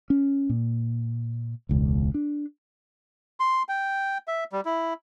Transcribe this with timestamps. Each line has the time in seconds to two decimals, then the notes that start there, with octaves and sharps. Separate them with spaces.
0.10 C#4
0.49 A#2
1.69 E1 C#2
2.14 D4
3.40 C6
3.69 G5
4.28 E5
4.53 G3
4.65 E4